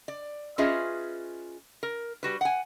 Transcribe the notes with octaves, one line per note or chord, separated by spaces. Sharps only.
D5
C#4 F4 G#4 B4 D#5 E5
A#4
G3 F#4 B4
F#5 G#5